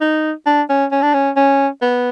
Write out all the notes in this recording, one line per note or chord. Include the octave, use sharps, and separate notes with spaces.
D#4
D4
C#4
C#4
D4
C#4
C#4
B3